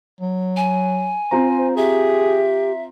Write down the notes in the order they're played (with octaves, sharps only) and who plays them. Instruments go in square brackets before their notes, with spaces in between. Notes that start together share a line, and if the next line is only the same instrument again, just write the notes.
[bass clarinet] F#3
[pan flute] G#5
[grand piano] C4 F4 A#5 [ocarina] C5
[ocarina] C5
[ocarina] G4 [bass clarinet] G#4 [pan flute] E5